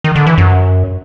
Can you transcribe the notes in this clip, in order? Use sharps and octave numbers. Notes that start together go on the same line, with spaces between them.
D#3
D3
E3
F#2